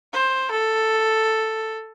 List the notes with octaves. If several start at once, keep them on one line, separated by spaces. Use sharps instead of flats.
C5
A4